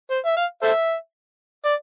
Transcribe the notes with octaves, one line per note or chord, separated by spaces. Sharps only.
C5
E5
F5
A4 C5 E5
D5